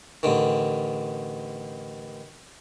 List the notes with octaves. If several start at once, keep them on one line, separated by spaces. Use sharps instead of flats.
A1 D3 D#3